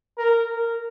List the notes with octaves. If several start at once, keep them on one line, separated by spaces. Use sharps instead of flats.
A#4
A#4